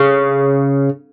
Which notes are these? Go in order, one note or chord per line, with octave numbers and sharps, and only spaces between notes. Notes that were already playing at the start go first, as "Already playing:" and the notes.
Already playing: C#3